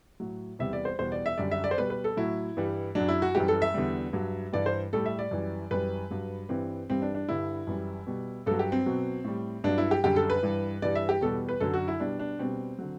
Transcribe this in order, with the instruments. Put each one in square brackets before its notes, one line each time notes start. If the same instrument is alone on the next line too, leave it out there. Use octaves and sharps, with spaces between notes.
[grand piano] A2 F#3
E2 C3 G3 E5
D5
C5
E2 B2 G3 C5
D5
E5
F#2 D3 G3 D5
E5
D5
C5
B2 G3 B4
B4
A4
A2 F#3 E4
G2 E3 G3
F#2 F#3 D4
E4
F#4
F#2 E3 G3 G4
A4
E5
E2 D3 G3
G2 F#3
G2 E3 G3 D5
C5
A2 G3 A4
E5
D5
F#2 E3 G3
F#2 E3 G3 B4
G2 F#3
G2 E3 G3 C4
G2 E3 G3 C4
D4
D4
G2 D3 G3 E4
F#2 E3 G3
B2 G3
G2 F#3 A4
G4
C4
B2 F#3
A2 G3
G2 F#3 D4
E4
G4
F#2 D3 G3 G4
A4
B4
G2 E3 G3
G2 E3 G3 D5
E5
G4
E2 B2 G3 A4
B4
F#2 D3 F#3 A4
F#4
E4
B2 G3 D4
D4
B2 G3 C4
D3 F#3